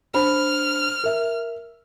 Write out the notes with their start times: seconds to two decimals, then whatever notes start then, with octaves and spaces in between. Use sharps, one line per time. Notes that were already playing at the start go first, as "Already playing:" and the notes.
0.14 D4 C5 B5 F6
1.04 A#4 E5